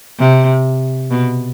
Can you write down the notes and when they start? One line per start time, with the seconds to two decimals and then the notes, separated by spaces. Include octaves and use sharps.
0.19 C3
1.11 B2